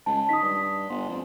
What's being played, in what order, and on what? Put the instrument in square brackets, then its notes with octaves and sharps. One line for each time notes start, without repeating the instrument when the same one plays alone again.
[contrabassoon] C#2 [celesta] A5
[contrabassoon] D#3 [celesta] D#6 B6
[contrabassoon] G2
[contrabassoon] G1 [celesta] C6
[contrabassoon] F2